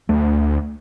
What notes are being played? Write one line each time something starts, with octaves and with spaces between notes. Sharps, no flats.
D2 A3